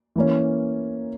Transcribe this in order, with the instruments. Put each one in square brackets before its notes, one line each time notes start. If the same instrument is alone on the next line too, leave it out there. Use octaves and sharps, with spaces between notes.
[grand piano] E3 A#3 C#4